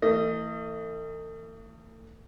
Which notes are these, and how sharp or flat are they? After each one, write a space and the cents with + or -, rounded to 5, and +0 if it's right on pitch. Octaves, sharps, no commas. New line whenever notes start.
E3 -10 A3 +40 D#5 +0